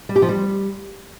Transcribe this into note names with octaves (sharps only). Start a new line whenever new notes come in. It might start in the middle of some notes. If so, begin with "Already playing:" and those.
G3
G4
F3
G3